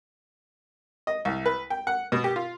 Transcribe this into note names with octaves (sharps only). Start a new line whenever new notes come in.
D#5
C2
B4
G5
F#5
B2
G4
F4